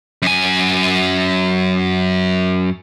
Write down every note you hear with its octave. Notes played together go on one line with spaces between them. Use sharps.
F#2 G#5